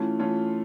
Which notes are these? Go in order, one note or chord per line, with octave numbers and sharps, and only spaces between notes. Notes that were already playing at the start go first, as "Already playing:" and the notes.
Already playing: E3 A3 C#4 F4
E3 A3 C#4 F4